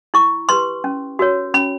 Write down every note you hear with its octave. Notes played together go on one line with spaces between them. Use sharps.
E4 C#6
G4 B4 C6
C#4
F#4 A#4 C#5
C#4 B5